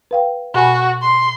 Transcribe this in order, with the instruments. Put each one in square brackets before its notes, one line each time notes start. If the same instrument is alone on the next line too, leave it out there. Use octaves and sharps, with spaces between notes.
[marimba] B4 F5 G5
[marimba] B2 G#5 B5 [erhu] F#4
[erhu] C6